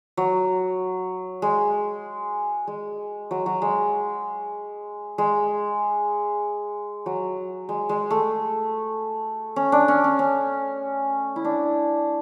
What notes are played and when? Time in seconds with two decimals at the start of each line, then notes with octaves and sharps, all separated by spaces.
0.17 F#3
1.42 G#3
2.67 G#3
3.31 F#3
3.46 F#3
3.62 G#3
5.18 G#3
7.06 F#3
7.69 G#3
7.89 G#3
8.11 A3
9.56 C#4
9.72 D4
9.88 C#4
10.04 C#4
10.19 C#4
11.36 E4
11.45 D4